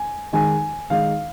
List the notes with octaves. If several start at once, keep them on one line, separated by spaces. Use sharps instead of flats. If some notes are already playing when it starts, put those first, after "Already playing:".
Already playing: G#5
D#3 G#3 D#4 G#5
D#3 G#3 D#4 F5